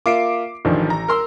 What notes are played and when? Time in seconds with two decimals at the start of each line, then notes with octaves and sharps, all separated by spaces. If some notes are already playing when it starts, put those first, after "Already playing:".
0.06 A#3 F4 E5 D6 C7 D7
0.65 A1 D#3 F3 D4
0.90 A#5
1.08 A#4 C6 E6